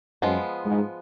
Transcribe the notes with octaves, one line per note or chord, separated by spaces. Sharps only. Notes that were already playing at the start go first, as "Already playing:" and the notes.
F#2 F3 G#3 B3
G#2